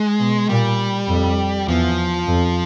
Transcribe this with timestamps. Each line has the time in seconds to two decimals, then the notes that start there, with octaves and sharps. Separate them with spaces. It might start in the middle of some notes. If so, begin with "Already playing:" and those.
Already playing: G#3
0.19 B2
0.49 A#2 G3
1.08 F2
1.68 E2 F3
2.27 F2